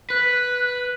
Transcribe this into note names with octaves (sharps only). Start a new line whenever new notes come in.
B4 F#6